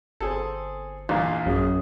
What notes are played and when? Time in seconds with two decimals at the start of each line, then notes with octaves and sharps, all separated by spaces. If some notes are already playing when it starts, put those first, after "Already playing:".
0.21 G1 C4 G#4 A4
1.09 A#1 E2 A#2 F5
1.46 A1 F#2 G#4